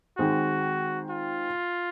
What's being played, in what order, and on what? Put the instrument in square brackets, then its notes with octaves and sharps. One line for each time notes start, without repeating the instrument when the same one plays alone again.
[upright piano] D#3 G#3 C4 [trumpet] F#4
[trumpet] F4